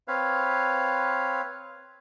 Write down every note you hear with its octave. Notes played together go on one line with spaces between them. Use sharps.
C4 B4 C#5 F5